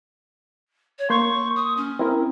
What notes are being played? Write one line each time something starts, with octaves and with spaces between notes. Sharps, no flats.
C#5
A#3 C6 C#6 G6
D#6
C#4
C4 E4 A#4